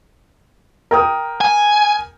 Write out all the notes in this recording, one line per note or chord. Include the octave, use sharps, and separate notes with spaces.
A#4 G5 D#6
G#5